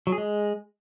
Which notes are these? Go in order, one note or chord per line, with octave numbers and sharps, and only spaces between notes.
F#3
G#4
G#3